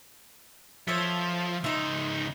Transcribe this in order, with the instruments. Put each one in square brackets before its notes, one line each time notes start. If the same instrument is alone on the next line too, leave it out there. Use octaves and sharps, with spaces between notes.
[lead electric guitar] F3 [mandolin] A4 C#5 E5
[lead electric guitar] C#2 D#4 [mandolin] E5 C6